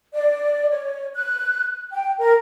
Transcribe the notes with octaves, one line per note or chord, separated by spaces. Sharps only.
D5
C#5
F#6
G5
A#4